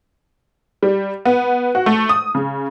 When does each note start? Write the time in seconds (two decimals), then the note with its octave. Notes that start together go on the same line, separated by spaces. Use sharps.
0.83 G3
1.25 B3
1.75 F#4
1.86 A3
2.09 D#6
2.35 C#3